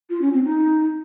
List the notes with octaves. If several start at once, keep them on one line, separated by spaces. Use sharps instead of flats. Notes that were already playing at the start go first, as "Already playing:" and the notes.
F4
C#4
C4
D#4